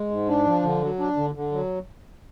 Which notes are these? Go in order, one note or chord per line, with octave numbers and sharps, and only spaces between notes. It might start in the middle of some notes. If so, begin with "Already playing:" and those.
Already playing: G#3
G#2
D4
F3
D3
F#3
D4
D3
D3
F#3